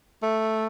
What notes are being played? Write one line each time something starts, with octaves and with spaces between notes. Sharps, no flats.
A3